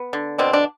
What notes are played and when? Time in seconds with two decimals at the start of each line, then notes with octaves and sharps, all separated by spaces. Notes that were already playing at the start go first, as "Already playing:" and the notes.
Already playing: B3
0.13 D3
0.38 B2 C4 D4
0.53 D4